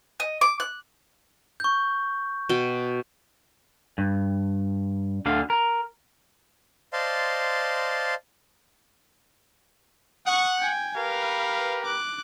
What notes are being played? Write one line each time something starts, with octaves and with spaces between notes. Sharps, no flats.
D#5
D6
F#6
C#6 G6
B2 G5
G2
D2 D3 F5
A#4
C5 D5 D#5 F5 A5 C6
F#5 C#6 D#6
G5 G#5
G4 A#4 B4 F5
D6 F#6